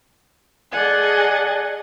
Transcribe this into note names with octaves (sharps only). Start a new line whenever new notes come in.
G#4 A4 D5 D#5 F#5 G#5